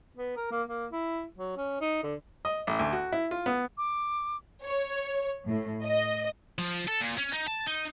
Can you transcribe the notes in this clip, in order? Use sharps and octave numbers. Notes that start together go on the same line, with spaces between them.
B3
A#4
A#3
A#3
E4
F#3
C#4
D#4
D3
D#5
A1
D2
F#4
E4
F4
B3
D6
C#5
A2
D#5
F3
A4
A#2
C#4
D#4
A5
D#4